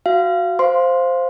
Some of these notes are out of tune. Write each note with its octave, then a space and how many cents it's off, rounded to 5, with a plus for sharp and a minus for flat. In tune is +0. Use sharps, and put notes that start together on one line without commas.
F#4 +0 F5 -25
C5 +0 F5 +0 C6 +0